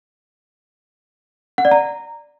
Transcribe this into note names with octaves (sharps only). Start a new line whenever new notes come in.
F#5
D5
A#5